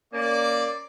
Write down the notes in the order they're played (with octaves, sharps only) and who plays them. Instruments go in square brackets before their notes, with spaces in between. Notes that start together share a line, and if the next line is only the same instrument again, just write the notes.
[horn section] A#3 C#4 [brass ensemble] D5